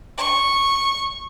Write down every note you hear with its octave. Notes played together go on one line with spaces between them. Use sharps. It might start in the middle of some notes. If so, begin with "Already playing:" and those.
C#6